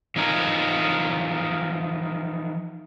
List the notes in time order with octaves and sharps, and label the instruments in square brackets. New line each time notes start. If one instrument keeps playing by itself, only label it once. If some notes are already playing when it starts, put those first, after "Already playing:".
[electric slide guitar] E3 F3 D#4 G#4 A#4